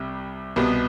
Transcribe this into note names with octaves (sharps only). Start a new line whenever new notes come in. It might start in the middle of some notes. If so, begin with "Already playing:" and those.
Already playing: C2 C3 G3
C2 B2 B3